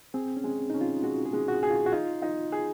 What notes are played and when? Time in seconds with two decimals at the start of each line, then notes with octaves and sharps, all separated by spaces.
0.14 C4 G#4
0.37 C#4
0.44 G#3
0.70 C#4 D#4
0.81 F4
1.03 G#3 F#4
1.25 G#4
1.33 G#3
1.48 F#4
1.63 G#4
1.70 F4
1.86 F#4
1.92 D#4 F4
2.22 D#4
2.52 G#4